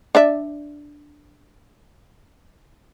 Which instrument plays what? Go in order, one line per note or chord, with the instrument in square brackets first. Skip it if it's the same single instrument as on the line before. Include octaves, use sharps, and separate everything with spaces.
[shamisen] D4 D5 E5